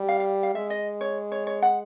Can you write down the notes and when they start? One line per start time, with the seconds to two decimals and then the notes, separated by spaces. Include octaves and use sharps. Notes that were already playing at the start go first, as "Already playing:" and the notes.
Already playing: G3
0.09 F5
0.20 F5
0.43 F5
0.54 G#3 E5
0.70 D#5
1.01 C#5
1.32 C#5
1.47 C#5
1.62 F#5